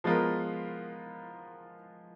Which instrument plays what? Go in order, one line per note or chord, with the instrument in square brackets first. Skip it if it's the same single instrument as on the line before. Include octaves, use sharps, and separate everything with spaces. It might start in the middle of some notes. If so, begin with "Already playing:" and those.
[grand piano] F3 G#3 B3 F4 A#4